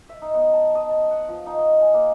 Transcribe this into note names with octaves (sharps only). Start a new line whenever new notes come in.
E5
D#4
B3
A5
D#5
A5
F#5
F3
D#4
D#5
G#5
A#3